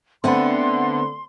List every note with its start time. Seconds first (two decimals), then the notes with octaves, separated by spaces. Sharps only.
0.24 D3 A3 B3 C4 C5 F#5 B5 C6